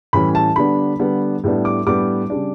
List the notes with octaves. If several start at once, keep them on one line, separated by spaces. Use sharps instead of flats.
A2 E3 G3 C#4 B5
A5
D3 G3 B3 D4 B5
D3 G3 B3 D4
A2 G3 B3 D4
D6
A2 G3 B3 D4 D6
C#3 G3 D4